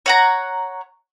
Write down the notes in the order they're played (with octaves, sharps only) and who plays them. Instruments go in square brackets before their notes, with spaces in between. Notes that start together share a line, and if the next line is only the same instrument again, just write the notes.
[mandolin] C#5 F#5 A#5